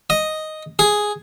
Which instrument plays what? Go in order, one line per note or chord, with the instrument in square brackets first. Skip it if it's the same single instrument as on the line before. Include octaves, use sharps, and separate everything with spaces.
[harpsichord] D#5
G#4